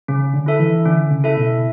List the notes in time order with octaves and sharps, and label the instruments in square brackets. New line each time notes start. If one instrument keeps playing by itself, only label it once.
[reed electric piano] C#3 [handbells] C#4
[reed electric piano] D3
[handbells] E4 A4 E5
[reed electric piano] E3
[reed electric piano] D3 [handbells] C#4
[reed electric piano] C#3
[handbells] E4 A4 E5
[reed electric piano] B2